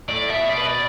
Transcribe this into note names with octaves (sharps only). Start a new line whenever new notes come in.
A2 D5
B2 E5
D5
B4
D5